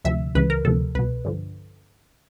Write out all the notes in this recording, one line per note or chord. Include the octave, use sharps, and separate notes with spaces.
D2 C3 F3 E5
C#2 C#3 E3 B4
A#4
D2 C3 F3 A4
C2 B2 B4
G2 D3 F3